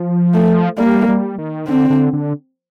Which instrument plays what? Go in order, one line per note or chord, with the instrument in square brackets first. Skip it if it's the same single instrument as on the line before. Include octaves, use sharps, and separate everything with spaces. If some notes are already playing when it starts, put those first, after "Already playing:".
Already playing: [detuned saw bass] F3
[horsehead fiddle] A3
[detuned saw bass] G3 [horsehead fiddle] A#3
[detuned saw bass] G3
D#3
[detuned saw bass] D3 [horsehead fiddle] C4
[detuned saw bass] D3
D3